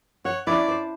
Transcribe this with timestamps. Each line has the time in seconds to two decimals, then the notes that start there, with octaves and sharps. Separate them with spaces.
0.25 C#5 F#5
0.47 C#4 D4 E4 D5
0.68 C5